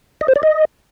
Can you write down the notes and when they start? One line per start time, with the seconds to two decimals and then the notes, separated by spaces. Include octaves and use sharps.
0.21 D#5
0.28 C5
0.36 D5
0.43 D#5